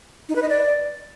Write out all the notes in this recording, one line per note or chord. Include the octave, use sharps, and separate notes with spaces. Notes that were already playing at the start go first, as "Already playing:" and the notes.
D#4
B4
D#5
D5